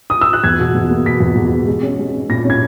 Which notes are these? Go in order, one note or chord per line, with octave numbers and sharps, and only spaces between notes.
D#6
E6
F#6
E2 G#6
B2
E2
A#3
B2 B6
E2
E2
B2
G#3
C#4
G#3
C#4
A#2 A#6
C#4
G#6